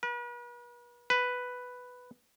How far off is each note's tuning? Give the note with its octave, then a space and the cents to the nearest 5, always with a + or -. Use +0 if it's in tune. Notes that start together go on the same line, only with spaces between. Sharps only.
B4 -40
B4 +5